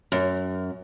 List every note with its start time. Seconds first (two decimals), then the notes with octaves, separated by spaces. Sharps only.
0.12 F#2